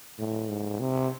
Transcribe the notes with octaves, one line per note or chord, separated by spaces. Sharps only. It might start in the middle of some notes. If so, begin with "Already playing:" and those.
A2
G#2
C3